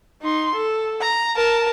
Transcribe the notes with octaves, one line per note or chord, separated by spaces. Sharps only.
D#4 C6
A4
A#5
A#4 A5